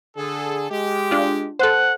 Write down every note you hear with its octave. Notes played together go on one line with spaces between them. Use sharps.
D3 G#4 A4
G#3 G4
D4 F4
A4 C5 F#5